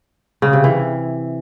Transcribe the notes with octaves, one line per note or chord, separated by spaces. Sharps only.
C#3
C3
E3